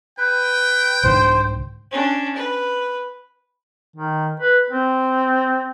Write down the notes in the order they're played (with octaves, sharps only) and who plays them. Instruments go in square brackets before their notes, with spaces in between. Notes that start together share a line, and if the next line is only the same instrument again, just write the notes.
[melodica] B4 [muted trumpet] G5
[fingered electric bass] C2 G#2 D3 [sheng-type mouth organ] C5
[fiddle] C#4 D4
B4
[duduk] D#3
B4
C4